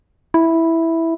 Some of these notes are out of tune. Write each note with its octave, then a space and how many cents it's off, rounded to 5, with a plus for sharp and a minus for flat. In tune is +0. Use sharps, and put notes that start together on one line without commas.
E4 -5